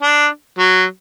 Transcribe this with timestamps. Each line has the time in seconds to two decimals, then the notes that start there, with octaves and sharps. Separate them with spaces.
0.01 D4
0.58 F#3